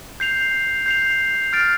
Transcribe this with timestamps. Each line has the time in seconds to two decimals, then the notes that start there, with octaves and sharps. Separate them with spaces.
0.20 G6 C7 F7
0.86 G6 C7 F7
1.53 F6 A6 D7